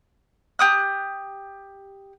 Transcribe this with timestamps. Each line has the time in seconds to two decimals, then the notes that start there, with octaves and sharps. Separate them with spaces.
0.59 G4 D#6 F#6